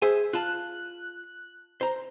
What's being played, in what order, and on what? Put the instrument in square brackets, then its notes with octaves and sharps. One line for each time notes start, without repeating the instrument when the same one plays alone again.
[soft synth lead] G#4 [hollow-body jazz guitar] C5 E5 G#5
[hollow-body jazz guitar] F4 A5 [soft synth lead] F#6
[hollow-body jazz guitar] C5 A#5